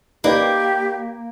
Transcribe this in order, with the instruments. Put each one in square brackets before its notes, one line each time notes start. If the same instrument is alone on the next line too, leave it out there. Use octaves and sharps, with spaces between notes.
[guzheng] A#3 [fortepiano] D#4 B4 D5 [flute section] G4